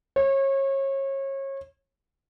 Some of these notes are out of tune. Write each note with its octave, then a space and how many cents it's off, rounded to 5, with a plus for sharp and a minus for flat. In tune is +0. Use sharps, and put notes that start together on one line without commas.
C#5 -30